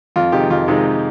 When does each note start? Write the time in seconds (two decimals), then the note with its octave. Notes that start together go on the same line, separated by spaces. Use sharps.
0.16 F2 F4
0.32 C3 D#3 G#3 D#4 G4
0.50 F2 F4
0.68 C3 D#3 G#3 D#4